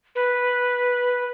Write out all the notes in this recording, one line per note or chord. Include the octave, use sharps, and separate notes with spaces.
B4